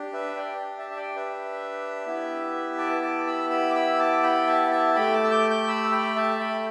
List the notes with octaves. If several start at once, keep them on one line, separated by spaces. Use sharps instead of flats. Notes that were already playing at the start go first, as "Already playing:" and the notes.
Already playing: D4 G4
B4 E5
D5 G5
E5 A5
E5
D5 G5
B4 E5
B3 E4 G4
A5 D6
A5 D6
B5 E6
B5 E6
D6
B5 E6
A5 D6
G5 B5
E5 A5
E5 A5
A3 G4 G5 B5
A5 D6
E6
D6 G6
D6 G6
B5 E6
G5 B5
E5 A5
G5 B5